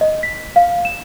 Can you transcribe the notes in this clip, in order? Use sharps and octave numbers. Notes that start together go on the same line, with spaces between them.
D#5
B6
F5
E7